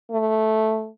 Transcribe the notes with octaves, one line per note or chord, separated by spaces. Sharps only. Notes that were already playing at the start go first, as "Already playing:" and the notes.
A3